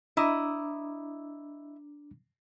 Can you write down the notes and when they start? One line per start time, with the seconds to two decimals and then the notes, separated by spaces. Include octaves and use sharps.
0.17 D4 E4 D#5 A#5 D6